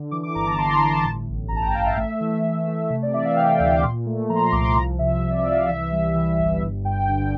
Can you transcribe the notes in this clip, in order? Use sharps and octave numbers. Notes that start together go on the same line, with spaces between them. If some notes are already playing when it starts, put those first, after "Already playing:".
Already playing: D3
E3 D6
D6
G1 A#5
A5
G1 C6
A#5
G1 A5
A5
A2
A1
A#5
A1 A5
G5
A1 F5
E5
A3
E3
A3
A3
C3 E5
D5
E3 E5
F5
E3 G5
G5
D2 F5
D6
A#2 C6
A3
F3 A#5
C6
A#5
C2 D6
C6
F3 A#5
C3 E5
C3
D5
E5
C2 F5
E3 E5
G3
E3
G1
G2
G2 G5
D3